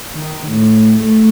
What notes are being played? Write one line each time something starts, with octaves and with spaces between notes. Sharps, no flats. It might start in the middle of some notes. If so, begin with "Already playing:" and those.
D#3
A2
A3